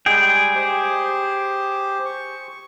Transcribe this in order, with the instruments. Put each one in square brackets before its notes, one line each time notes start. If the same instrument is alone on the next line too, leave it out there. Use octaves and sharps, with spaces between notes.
[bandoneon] G3 G#3 [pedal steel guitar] G#4 G5
[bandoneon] G4 C5
C#6